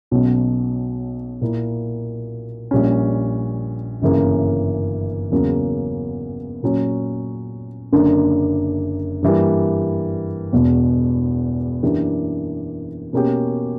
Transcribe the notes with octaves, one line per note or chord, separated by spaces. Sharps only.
B1 B2 F#3 C#4
A#2 A#3 E4
A#1 A#2 G3 C#4
G1 F#2 C#3 E3 A#3
E2 C#3 F#3 A#3
A#2 F#3 C#4
F#1 F#2 D3 A#3 D4
G2 E3 G3 A#3
E1 E2 B2
F#2 E3 A#3 D4 G4
B2 A#3 C#4 G4